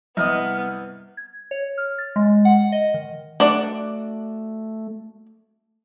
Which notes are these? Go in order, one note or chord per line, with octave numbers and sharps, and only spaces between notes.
C2 B3 D#5 D#6 F6
G#6
C#5
F6
A6
G#3
F#5
D#5
D#3
A3 D4 F#4 D5